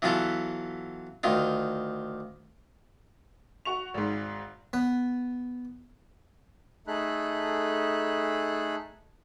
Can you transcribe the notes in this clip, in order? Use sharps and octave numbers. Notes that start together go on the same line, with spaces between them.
E3 F#3 B3 F4 A4
D2 D#3 F4
F#4 C#6 F7
G#1 G#2
B3 B4
A3 D#4 G#4 A4 B5 F#6